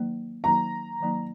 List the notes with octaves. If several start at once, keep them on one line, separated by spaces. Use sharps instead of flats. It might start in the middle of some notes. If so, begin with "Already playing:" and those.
Already playing: D#3 F#3 A#3 D#4
D#3 F#3 A#3 D#4 A#5
D#3 F#3 A#3 D#4